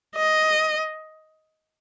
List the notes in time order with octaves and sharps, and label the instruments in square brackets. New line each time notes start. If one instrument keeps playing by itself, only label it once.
[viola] D#5